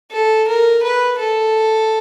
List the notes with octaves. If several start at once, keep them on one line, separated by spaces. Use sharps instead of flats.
A4
A#4
B4
A4